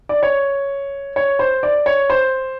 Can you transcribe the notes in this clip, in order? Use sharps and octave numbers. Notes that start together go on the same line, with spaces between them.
D5
C#5
C#5
C5
D5
C#5
C5